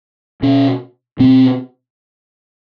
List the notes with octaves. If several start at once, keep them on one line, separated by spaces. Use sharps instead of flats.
B2 C#4
B2 C4